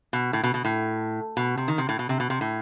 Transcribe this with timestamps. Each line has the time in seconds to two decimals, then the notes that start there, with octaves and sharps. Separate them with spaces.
0.13 B2
0.33 A2
0.43 B2
0.54 B2
0.65 A2
1.37 B2
1.57 C3
1.68 D#3
1.78 C3
1.89 A2
1.99 B2
2.09 C3
2.20 B2
2.30 C3
2.41 A2